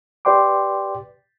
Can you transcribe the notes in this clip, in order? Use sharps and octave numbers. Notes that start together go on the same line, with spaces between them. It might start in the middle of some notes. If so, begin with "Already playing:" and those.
G4 B4 D5 G5 C6 D6